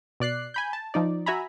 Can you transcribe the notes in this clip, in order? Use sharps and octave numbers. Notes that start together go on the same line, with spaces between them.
B2 D5 F#6 C7
G#5 B5 G6
A5
F3 D#4 D5
F#4 E5 G#5 A#5 B5